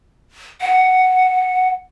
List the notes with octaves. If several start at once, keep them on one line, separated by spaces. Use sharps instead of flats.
F#5